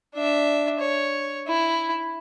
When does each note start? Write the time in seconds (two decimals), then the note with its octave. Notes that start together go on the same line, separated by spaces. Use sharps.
0.15 D4 E5
0.80 C#5
1.48 E4